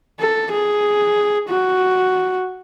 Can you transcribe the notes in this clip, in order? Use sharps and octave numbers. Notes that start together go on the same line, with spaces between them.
A4
G#4
F#4